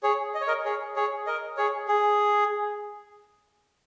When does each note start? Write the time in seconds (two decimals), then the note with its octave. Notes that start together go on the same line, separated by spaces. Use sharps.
0.03 G#4 C#5
0.35 D#5
0.41 C#5
0.48 A#4 D#5
0.65 G#4 C#5
0.96 G#4 C#5
1.27 A#4 D#5
1.57 G#4 C#5
1.88 G#4